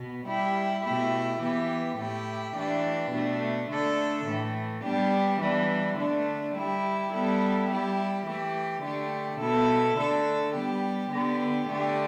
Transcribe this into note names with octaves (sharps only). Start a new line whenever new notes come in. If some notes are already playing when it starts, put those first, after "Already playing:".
Already playing: B2 B3
G3 E4 G4
B2 A3 E4 G4
E3 B3 G4
A2 A3 E4 G4
E3 A3 D4 G4
B2 A3 D4
D3 A3 D4 A4
A2 E3 A3
G3 B3 D4 G4
E3 G3 B3 D4
D3 A3 D4
G3 E4 G4
G3 B3 E4 A4
G3 E4 G4
E3 A3 G4
D3 A3 G4
B2 B3 E4 A4
D3 A3 D4 A4
G3 B3 G4
D3 B3 G4
D3 A3 G4